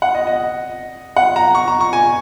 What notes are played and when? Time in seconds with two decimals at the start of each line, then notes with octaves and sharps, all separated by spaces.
0.02 F#5
0.15 D#5
0.27 D#5
1.16 F#5
1.36 A#5
1.55 C#6
1.68 A#5
1.81 C#6
1.93 G#5